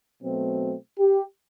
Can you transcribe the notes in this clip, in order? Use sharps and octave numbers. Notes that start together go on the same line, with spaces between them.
B2 F#3 A3 C4
G4